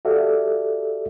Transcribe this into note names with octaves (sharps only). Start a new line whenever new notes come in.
F#4 G4 A4 D5 E5 F5